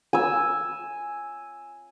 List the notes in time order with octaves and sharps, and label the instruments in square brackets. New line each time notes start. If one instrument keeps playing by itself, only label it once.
[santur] G#5 E6